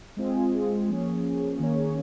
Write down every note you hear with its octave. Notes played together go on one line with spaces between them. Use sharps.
G#3 C4 F4 G#4
F3 A#3 C#4 G#4
D#3 A#3 C#4 G#4 C#5